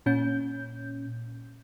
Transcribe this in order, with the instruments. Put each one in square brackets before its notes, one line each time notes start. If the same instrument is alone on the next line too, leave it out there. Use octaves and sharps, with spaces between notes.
[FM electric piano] A#2 C#4 G6